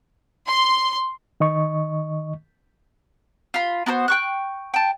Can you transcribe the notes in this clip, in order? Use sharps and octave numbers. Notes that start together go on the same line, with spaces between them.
C6
D#3 D#5 C#6
F4 B5
B3 F#4 A#4 C5
G5 C#6 F#6
G5 A5